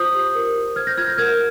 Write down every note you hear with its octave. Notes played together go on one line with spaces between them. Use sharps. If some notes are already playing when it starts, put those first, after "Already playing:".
Already playing: F4 C5 D#6 G6
G4
A#4
F4
C5 F6 G#6
G6 A#6
F4 F6 G#6
G6 A#6
A#4 F6 G#6